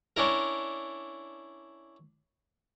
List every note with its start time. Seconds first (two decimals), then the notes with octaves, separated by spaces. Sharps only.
0.16 C#4 D4 E4 A#4